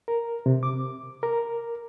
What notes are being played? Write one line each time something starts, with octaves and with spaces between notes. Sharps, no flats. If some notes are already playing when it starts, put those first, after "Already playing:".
A#4
C3
D6
A#4